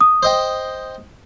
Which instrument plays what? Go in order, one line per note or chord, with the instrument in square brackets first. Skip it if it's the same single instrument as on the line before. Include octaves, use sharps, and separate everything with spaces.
[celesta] D#6
[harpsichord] C5 D#5 G5